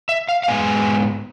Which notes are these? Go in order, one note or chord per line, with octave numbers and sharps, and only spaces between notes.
E5
F5
F5
G#2 G#3 B3 G#5